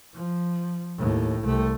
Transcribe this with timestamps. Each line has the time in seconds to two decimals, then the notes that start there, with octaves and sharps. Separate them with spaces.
0.14 F3
0.97 D#2 A2
1.42 C2 A3